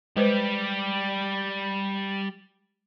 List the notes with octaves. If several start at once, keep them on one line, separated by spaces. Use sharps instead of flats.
G3 G#3 G4 B4 C5